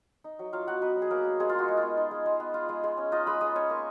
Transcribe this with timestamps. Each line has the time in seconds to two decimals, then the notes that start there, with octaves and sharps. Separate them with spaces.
0.24 D#4
0.39 F#3
0.53 F#3 F4 F5
0.67 B3 F#4 F#5
0.82 B3 D#4 B4
0.96 F#3
1.02 G#4
1.10 F#3 A#3 A#4
1.25 B3
1.40 G#3 D#4 G#4
1.49 F4
1.54 G#3 F#4
1.68 G#3
1.77 B3 F4
1.97 D#4
2.11 G#3
2.26 G#3
2.40 B3
2.54 F4
2.69 G#3
2.83 G#3
2.97 C#4
3.12 D#4 F4 D#5
3.26 G#3 B4 B5
3.41 G#3 D#5 D#6
3.55 C#4 C#5 C#6
3.69 A#3